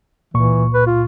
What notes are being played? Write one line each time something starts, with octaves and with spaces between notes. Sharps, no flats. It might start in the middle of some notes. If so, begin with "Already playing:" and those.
C#2 A#2 E3 C#6
B4
F4